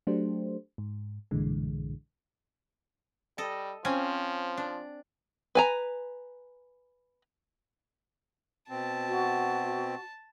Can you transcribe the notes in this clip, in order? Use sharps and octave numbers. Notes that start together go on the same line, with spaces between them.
F#3 A3 D4 G4 C5
G#2
B1 G2 A#2 D3 E3 G#3
G3 A4 D#5
F3 C4 C#4 G#5
D4
B4 G#5 A#5
B2 C4 A5
F#4